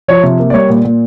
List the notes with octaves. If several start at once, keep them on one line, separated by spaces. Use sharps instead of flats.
F3 C#5
C3
A#3
D5
G3 C#5
A#2
A#2